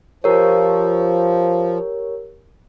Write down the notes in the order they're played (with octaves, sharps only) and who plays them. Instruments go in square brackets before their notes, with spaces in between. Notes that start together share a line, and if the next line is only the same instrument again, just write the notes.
[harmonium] F3 [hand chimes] G4 A#4 C#5